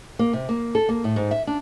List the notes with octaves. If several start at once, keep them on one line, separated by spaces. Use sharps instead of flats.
A#3
C3
A#3
A4
A#3
A2
G#2
E5
D4